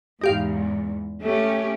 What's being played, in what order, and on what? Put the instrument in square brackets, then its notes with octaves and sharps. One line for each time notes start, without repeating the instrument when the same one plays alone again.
[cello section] E2 G#2 [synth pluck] D#4 G4 F5
[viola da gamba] A3 [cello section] C#4 G4